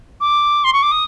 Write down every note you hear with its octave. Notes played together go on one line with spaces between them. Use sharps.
D6
C6
C#6
D6
D#6